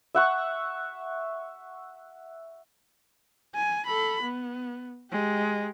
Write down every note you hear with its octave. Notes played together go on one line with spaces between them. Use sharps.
E5 F#5 C#6
G#5
A4 B5
B3
G#3 G4